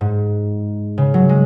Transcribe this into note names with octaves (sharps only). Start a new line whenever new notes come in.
G#2
C#3
F#3
G#3